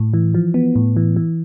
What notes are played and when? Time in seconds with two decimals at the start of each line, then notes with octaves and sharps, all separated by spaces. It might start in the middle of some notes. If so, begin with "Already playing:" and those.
Already playing: A2
0.14 E3
0.34 F3
0.54 B3
0.76 A2
0.96 E3
1.16 E3